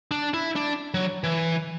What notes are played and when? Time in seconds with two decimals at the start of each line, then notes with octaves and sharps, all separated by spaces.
0.11 D4
0.34 E4
0.56 D4
0.94 F#3
1.24 E3